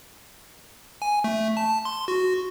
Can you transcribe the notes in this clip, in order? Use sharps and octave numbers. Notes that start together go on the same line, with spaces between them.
G#5
A3
A5
C6
F#4